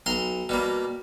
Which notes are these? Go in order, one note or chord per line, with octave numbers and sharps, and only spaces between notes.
B1 A#5 C6
B2 G3 A#3